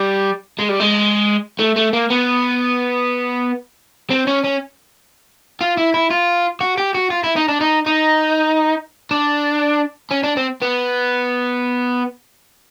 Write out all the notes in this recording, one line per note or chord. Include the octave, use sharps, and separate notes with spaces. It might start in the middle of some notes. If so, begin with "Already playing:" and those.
Already playing: G3
G#3
G3
G#3
A3
A3
A#3
B3
C4
C#4
C#4
F4
E4
E4
F4
F#4
G4
F#4
F4
E4
D#4
D4
D#4
D#4
D4
C#4
D4
C4
B3